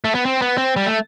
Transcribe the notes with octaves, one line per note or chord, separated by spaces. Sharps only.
A3
B3
C4
B3
C4
G3
A3